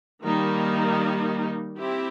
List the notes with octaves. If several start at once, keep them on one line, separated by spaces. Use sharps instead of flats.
D#3 G3 A#3 D#4
C4 E4 G4